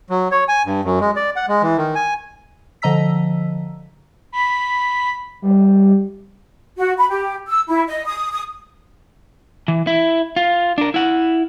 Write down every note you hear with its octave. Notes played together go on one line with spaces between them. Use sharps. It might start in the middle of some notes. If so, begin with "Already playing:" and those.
F#3
C#5
G#5
G2
F#2
G#3
D5
F#5
G#3
E3
D#3
G#5
D3 F3 D#5 A#5 E6 B6
B5
G3
F#4
B5
G4
E6
E4
D#5
D#6
D#6
E3
E4
F4
D4 A#4
E4 F#5